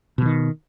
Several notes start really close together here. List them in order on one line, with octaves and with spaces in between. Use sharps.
B2 E3 D#3